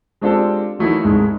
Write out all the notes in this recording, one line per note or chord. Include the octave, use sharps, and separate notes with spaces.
G#3 C4 D4 F4 G4 A4
E3 F#3 A3 A#3 D#4 E4
C2 G#2 G#3 A3